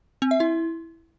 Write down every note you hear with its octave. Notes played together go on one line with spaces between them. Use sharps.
C4
E5
E4